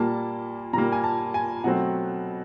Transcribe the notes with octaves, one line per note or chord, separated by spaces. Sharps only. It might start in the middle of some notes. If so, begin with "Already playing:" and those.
Already playing: A#2 G3 A#3 A5
A#2 G3 A#3 A#5
G#5
A5
G#5
B2 F#3 A3 C4 F#5